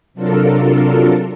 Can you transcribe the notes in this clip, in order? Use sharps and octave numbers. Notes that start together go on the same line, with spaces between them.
C3 F#3 D4 F4 A4 A#4